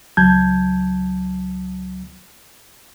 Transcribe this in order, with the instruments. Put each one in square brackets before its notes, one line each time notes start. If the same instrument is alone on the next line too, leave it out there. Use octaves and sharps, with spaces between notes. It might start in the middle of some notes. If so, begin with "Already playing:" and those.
[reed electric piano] C#2 F#3 A5 G6 G#6